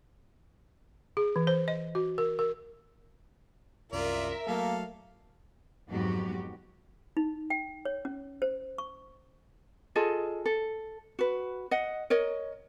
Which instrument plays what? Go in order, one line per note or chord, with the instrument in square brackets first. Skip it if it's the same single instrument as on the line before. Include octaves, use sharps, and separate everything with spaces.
[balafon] G#4
E3
C5
D#5
F#4
A#4
A#4
[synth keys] C2 F#2 [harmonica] F4 D5 [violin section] A#4 E5
[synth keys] F#3 A3 [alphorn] A#3 [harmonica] A4 F5
[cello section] F2 G#2 F#3 B3 F#4 G4
[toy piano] D#4
G5
C#5
C#4
C5
C#6
[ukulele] F4 G#4 A4 D#5
A4
F#4 B4
D#5 F#5
A#4 C#5 D#5